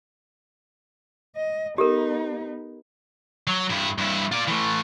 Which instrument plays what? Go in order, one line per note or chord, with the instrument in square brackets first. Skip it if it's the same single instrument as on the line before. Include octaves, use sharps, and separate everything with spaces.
[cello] D#5
[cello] B3 D#4 [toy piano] G4 A4 A#4
[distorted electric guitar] F#3
G2 E4
G2 E4
F4 D5
E3 A3